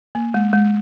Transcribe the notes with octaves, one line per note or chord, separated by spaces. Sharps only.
A#3
G#3
G#3